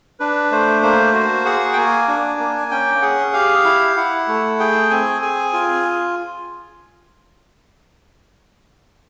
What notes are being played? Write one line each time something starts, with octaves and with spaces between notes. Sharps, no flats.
D4 B4
A3 C5
A#3 C5
F#4 C5
G#4 F#5
G5
A#3 G#5
D4
A#3
C#4 G5
G#4 F#5
G4 F5
E4
E4 F#5
A3
G#4 G5
C4 G#5
G#4 G#5
F4